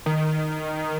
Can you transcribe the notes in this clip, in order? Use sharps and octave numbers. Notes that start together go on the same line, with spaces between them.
D#3